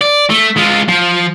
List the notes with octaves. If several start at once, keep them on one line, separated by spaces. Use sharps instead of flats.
D5
A3
G#3 F4
F3